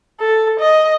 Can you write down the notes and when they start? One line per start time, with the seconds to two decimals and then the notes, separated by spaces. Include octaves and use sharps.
0.20 A4
0.60 D#5